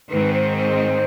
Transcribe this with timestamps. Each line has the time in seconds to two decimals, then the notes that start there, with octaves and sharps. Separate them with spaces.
0.11 G#2 D#3 G#3 C4 B4
0.34 C5
0.57 C5